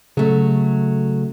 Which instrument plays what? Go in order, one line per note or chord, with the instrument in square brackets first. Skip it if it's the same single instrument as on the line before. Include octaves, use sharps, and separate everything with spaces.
[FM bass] C#3 [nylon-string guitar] F#3 A3